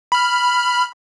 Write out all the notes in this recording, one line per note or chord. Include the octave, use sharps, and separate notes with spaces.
B5 F6